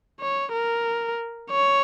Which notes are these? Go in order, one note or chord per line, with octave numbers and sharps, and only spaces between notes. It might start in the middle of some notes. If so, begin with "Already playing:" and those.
C#5
A#4
C#5